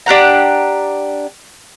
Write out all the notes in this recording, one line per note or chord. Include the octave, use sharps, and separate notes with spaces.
D4 G4 F#5 A#5